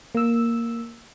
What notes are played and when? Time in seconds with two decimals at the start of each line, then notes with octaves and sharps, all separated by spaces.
0.15 A#3 E6